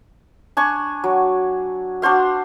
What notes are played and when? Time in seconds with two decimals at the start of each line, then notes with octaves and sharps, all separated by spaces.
0.57 D4 G#5 C#6
1.04 F#3
2.02 D4 F#4 C5 F5